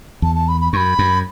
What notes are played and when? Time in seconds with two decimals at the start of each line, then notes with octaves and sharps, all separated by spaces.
0.22 E2 A5
0.36 A5
0.48 B5
0.61 B5
0.73 F#2 C#6
0.77 B5
0.99 F#2